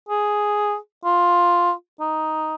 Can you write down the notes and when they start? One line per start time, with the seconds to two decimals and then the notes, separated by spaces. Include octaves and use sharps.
0.09 G#4
1.05 F4
2.00 D#4